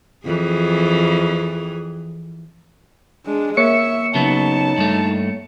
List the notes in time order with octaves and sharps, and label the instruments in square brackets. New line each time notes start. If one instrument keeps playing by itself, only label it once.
[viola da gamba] F2 E3 G#4
[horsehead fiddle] G#3 D4
[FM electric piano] A#3 C#5 C#7 [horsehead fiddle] E5
[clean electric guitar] C#3 F#3 B3 [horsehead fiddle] D#4 A5
[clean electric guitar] G2 A3